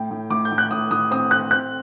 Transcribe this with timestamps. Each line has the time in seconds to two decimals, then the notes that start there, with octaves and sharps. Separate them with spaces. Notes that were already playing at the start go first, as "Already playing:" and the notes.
Already playing: A2 G5
0.11 A2
0.30 A2 D6
0.45 G6
0.51 A2
0.58 F#6
0.71 A2 D#6
0.91 A2 D#6
1.11 C4 D#6
1.31 C4 F#6
1.51 C4 F#6